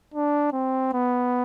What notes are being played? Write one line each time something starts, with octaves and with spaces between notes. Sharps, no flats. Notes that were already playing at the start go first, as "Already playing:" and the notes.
D4
C4
B3